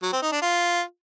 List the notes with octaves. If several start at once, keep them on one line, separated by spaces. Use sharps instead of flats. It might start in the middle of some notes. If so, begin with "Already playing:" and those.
F#3
C4
D#4
D4
F4